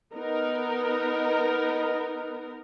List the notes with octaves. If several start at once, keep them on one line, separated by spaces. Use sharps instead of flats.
B3 D#4 A#4